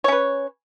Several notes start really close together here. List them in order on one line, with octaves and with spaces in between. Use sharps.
C#5 C#4 B4